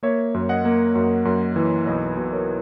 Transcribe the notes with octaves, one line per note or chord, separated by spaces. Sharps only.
A#3 C#5 E5
F#2
D#5 F#5
A#3
F#2
F#2
E3
B1 B4 D#5
B2
A#4 C#5